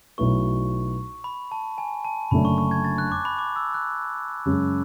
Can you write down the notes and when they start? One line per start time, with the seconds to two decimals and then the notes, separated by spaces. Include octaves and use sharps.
0.18 B1 B2 A3 E4 B4 C#6
1.24 B5
1.51 A5
1.78 G#5
2.05 A5
2.31 F#1 F#2 D3 A3 D4 B5
2.45 C#6
2.58 C#6
2.71 G#6
2.85 A6
2.98 F#6
3.12 D6
3.25 B5
3.39 D6
3.56 E6
3.74 F#6
4.45 F#2 C#3 G#3 C#4